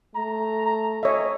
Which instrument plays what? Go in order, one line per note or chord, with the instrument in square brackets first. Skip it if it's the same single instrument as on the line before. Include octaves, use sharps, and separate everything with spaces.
[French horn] A3 [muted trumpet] A#5
[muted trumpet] A#5
[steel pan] C#5 E5 [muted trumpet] D#5